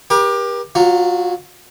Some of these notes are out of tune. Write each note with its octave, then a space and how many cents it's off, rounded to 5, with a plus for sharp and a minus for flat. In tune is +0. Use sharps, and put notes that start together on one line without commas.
G4 +20 A#4 +45
F#3 +0 F4 +25